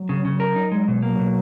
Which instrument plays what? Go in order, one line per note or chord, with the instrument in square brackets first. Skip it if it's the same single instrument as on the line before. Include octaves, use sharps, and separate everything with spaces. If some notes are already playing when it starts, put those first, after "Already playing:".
Already playing: [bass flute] F#3
[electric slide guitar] C#3
C#3
A#4
D#4
G#3
B2
[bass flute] F#3 [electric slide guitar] A#3
[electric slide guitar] B2